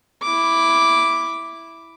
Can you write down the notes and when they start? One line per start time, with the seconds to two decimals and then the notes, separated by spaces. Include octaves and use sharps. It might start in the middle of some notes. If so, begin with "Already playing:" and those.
0.23 E4 D6